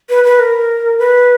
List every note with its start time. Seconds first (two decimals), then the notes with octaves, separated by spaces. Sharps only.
0.09 B4
0.24 B4
0.39 A#4
0.99 B4